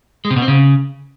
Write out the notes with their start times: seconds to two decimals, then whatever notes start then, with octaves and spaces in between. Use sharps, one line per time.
0.25 G#3
0.30 C3
0.36 B2
0.42 C4
0.48 C#3